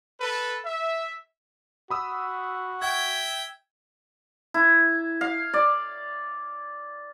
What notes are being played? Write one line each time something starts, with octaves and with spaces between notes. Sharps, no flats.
A4 B4
E5
F#4 B5 D#6 E6
E5 G5 G#6
E4
F5
D5